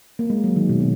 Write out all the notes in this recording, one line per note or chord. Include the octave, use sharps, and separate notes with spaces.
A#3
G#3
F#3
D#3
B2
B2